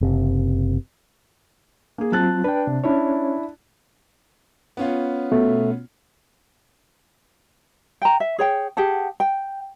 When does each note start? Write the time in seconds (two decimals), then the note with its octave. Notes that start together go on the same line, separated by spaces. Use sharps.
0.01 F#1 C3
1.98 A#3 G#4
2.12 F#3 C4 F4 A5 F#6 A6
2.44 D4 B4 G5
2.67 C3
2.84 C#4 D4 E4 C#5
4.77 B3 C#4 F4
5.32 B2 A3
8.02 G5 A#5
8.20 E5
8.38 G#4 C#5 G5
8.77 G4 G#4 F#5 A5
9.20 G5